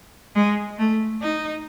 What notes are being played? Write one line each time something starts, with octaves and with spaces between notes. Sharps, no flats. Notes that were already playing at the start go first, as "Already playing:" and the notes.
G#3
A3
D#4